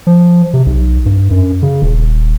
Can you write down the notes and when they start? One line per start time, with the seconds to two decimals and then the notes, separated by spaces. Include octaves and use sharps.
0.07 F3
0.54 C3
0.66 B1
1.06 G2
1.31 F#2
1.62 C#3
1.82 D#1